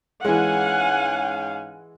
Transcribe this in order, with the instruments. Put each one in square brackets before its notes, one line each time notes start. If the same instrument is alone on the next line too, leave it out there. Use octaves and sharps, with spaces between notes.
[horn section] G#2 C#4 F5 [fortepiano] E3 G#3 [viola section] F#5 G#5